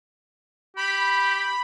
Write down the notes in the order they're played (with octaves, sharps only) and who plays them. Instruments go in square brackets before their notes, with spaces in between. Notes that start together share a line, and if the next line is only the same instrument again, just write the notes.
[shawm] G4 [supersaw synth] B5